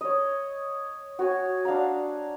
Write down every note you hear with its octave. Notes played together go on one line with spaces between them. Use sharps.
C#5 D#5
F#4 C#5 G#5
D4 F5 F#5 A#5